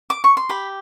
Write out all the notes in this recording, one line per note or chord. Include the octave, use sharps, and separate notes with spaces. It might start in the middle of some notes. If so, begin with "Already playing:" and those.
D6
C#6
C6
G4 B5